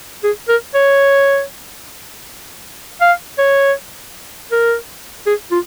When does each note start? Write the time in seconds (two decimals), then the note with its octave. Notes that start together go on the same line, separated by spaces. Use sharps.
0.23 G#4
0.48 A#4
0.74 C#5
3.01 F5
3.38 C#5
4.52 A#4
5.26 G#4
5.51 F4